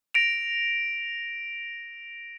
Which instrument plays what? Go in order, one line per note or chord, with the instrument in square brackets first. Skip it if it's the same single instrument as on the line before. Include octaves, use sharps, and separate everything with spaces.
[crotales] A#6 D7 F7